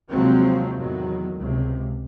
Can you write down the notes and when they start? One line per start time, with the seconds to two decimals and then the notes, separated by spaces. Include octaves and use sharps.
0.11 D#2 C3 F3 F#3 G#3 C4
0.78 E2 A2 D#3 F#3
1.35 C#2 C3